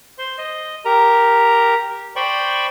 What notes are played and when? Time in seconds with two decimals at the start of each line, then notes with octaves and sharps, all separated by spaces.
0.18 C5 C6
0.38 D#5
0.85 G4 A#4 A#5
2.16 C5 D5 G5 B5 C#6